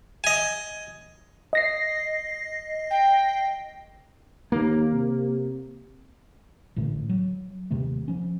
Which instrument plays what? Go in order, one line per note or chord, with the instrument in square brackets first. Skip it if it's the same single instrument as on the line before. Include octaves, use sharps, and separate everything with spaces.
[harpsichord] D#5 G#5
[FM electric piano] D#5 A#6 C7
[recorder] G5
[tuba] D#2 [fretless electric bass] A#3
[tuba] C3
[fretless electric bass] A1 A2 D3 A3
F#3
D#2 C3 D#3 A3
F3 C#4